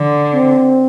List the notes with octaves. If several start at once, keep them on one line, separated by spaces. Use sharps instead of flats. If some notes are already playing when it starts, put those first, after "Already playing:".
Already playing: D3
C4